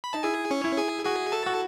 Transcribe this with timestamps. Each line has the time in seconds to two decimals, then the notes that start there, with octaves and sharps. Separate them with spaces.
0.04 B5
0.13 D#4 A5
0.23 E4 G#4 G#5
0.51 C#4 C#5
0.64 E4
0.77 G#4 G#5
1.05 F#4 G#4 G#5
1.32 A4 A5
1.46 F#4